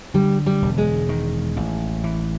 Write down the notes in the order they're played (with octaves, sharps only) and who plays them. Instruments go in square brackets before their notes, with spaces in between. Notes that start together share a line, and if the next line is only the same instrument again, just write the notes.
[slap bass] D3 [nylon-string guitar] G3
[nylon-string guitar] G3
[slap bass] E1
[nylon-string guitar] G#3
[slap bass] D#3
A1
E3